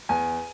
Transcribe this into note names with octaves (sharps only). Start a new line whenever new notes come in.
E2 G#5